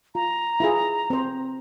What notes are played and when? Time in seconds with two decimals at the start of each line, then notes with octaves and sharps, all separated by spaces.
0.15 F4 A#5
0.60 E4 F4 G#4
1.10 C4 C5